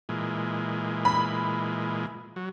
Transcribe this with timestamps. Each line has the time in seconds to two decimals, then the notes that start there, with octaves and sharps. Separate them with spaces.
0.09 A#2 E3 G#3
1.05 B5
2.36 F#3